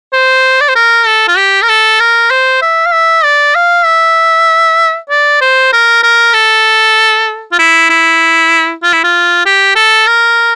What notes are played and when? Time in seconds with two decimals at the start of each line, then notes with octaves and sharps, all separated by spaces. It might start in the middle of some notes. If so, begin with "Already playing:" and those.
0.13 C5
0.60 D5
0.68 C5
0.75 A#4
1.06 A4
1.28 F4
1.37 G4
1.62 A#4
1.69 A4
2.00 A#4
2.30 C5
2.62 E5
2.86 F5
2.93 E5
3.24 D5
3.55 F5
3.85 E5
5.10 D5
5.41 C5
5.73 A#4
6.03 A#4
6.34 A4
7.52 F4
7.59 E4
7.90 E4
8.83 F4
8.93 E4
9.04 F4
9.46 G4
9.76 A4
10.07 A#4